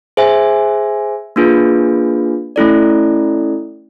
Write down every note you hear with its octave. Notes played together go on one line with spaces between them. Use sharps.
G#4 C5 E5 G#5
A#3 D4 F4 G#4 B4
A3 C#4 E4 A4 D5